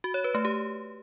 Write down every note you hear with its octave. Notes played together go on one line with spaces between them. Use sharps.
F#4
C#5
B4
A3
G4